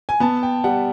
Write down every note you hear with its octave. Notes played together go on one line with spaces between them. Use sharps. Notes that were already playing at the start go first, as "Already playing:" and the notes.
G#5
B3 A5
G5
G3 F#5